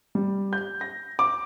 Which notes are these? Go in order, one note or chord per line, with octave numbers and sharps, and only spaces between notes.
G3
G6
A#6
D6